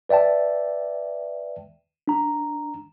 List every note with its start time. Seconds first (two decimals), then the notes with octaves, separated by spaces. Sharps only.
0.09 B4 D5 E5 G5 A5
2.08 D4 A#5